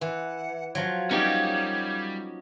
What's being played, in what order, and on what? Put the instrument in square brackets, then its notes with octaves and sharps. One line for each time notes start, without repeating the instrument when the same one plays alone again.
[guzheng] E3 [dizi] F#5
[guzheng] F3 F#3 [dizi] G#6
[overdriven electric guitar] G3 [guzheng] A#3 [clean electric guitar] C#4 D#4 G4